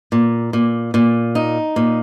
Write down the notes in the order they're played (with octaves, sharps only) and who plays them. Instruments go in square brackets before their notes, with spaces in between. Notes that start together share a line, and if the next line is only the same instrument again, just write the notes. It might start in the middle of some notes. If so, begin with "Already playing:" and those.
[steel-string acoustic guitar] A#2
A#2
A#2
D#4
A#2